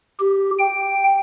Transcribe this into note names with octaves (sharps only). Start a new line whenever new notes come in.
G4
G5